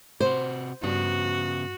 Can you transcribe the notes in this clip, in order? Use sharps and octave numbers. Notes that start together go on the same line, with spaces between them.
C3 F#4 C5
G2 C#3 B3 F#4